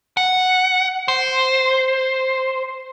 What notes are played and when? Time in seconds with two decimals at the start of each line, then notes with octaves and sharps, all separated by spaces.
0.17 F#5
1.08 C5